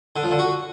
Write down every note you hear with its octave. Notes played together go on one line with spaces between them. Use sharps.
D3
F3
D3
F#4